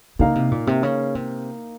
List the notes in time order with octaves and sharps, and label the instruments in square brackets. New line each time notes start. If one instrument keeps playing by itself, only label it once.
[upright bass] C#3 [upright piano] A#3 D#4 A#4 F5
[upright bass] C3
A#2
C3
C#3
C3